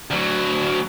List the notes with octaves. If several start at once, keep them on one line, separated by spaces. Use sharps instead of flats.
D2 F#3